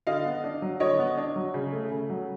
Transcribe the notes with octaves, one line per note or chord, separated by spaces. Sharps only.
D3 D#5 F5
B3
D4
F#3
D3 C#5 D#5
B3
D4
F#3
C#3
A3
C#3
F#3